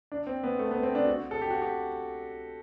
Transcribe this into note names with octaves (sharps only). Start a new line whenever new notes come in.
D4
C4
B3
A3
B3
C4
D4
F#4
A4
G4
F#4
G4